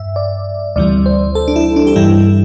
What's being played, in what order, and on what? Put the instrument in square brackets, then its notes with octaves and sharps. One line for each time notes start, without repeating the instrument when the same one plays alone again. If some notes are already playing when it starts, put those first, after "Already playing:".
Already playing: [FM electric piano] G2 E5
D5
D2 C3 E3 G3 D5
C5
A4
D4
E4
D4
G4
G2 E3 G3 E4